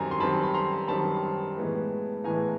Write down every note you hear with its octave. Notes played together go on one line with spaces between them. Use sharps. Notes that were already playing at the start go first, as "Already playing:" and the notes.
Already playing: F#2 D#3 G3 C4 G#5 A#5
C6
F#2 D#3 G3 C4 A5 B5
B5
A#5 C6
F#2 D#3 G3 C4 A5 B5
A2 E3 G#3 B3
A2 E3 G#3 B3 G#5 A#5